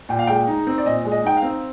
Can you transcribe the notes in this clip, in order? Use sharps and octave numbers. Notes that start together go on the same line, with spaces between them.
A#2 G5
F5
G#3 G5
D#4
C4
D5
A#2 D#5
G#3
D#5
D#4 G5
F5
C4